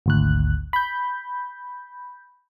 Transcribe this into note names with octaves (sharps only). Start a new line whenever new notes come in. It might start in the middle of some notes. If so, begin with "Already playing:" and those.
G#1 D2 F#6
B5 G6